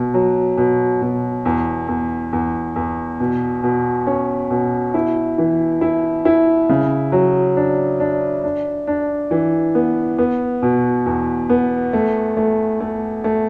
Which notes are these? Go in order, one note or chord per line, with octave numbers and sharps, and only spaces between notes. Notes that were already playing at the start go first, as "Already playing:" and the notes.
Already playing: B2
F#3
B2
B2
E2
E2
E2
E2
B2
B2
C#4
B2
E4
E3
E4
E4
C#3
F#3
D4
D4
D4
D4
E3
B3
B3
B2
E2
B3
A3
A3
A3
A3